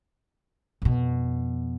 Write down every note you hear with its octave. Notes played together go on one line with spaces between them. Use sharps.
F2 B2